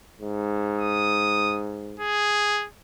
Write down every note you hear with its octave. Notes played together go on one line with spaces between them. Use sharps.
G#2
D#6
G#4